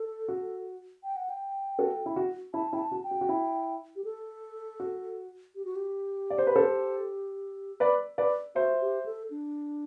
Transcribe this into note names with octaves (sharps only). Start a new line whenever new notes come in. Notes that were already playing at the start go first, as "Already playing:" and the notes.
Already playing: A4
F#4
G5
F#5
G5
F#4 A4
E4
F#4
E4 A5
E4 G5
A5
F#4
G5
F#4
F#4
E4
G4
A4
F#4
G4
F#4
G4
D5
C5
B4
A4 C5
B4 D5
B4 D5
F#4 C5 E5
G4
A4
D4